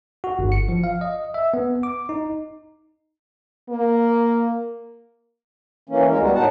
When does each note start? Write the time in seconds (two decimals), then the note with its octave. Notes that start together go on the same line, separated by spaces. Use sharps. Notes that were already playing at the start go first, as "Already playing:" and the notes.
0.24 F#4
0.39 G1
0.52 C#7
0.69 F3
0.84 F5
1.01 D#5
1.34 E5
1.54 B3
1.83 D6
2.09 D#4
3.69 A#3
5.89 E3 A#3 C#4
6.08 D2 G#3 A#4
6.21 G3 B3 F#4
6.35 A2 D#4 F#5 A5